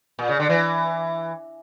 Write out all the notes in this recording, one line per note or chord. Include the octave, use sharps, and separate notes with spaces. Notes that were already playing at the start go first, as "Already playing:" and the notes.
A#2
C#3
D3
E3